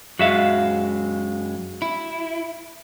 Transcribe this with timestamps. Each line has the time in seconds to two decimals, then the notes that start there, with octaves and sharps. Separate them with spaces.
0.19 F#2 G#3 F#4 E5 F5
1.82 E4